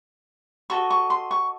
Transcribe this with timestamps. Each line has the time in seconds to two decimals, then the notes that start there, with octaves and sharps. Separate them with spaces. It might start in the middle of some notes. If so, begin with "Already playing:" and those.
0.70 F#4 A4 D#5 C#6
0.90 C#6
1.10 C6
1.31 C#6